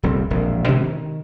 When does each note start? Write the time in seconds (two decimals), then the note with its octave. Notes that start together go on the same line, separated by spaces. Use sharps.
0.03 D#1 C2 C4
0.30 E1 A#1
0.68 B2 D3 G#3 C#4
0.83 D#3